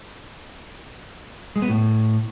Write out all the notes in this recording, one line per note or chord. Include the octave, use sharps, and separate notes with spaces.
G#3
B3
A2